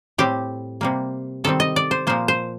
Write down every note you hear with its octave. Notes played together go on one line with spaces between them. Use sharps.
A2 G3 C4 G4
C3 G3 A#3
C3 D#3 G3 C4 A4
D#5
D5
C5
A#2 F3 A#3 C5
C5